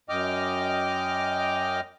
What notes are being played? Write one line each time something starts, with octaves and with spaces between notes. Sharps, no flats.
F#2 D#5 G5 D6 F6